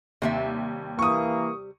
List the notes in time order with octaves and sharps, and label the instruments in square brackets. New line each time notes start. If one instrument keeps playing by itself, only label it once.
[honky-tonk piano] D#2 [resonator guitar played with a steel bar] C3 G3 E5
[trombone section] E3 A#3 [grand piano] C#6 D#6